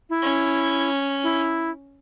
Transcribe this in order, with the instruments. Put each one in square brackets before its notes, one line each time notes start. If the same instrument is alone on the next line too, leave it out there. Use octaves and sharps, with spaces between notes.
[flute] E4
[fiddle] C#4
[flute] E4